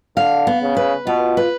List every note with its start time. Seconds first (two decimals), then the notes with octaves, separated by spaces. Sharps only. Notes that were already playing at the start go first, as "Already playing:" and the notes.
0.17 D3 F5
0.47 B3
0.62 C#3
0.77 B4
1.07 B2 F4
1.37 B4